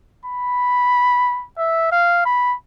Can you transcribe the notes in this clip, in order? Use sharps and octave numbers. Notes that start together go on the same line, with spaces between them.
B5
E5
F5
B5